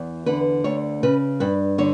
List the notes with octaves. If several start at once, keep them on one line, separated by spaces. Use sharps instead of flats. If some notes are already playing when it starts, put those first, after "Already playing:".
Already playing: E2
D3 B4
D2 C#5
C#3 B4
G2 B4
D3 C#5